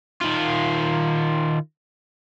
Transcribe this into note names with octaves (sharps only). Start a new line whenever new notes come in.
D#3 F4